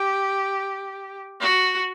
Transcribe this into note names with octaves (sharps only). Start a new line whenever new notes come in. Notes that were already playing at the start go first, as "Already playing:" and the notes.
Already playing: G4
F#4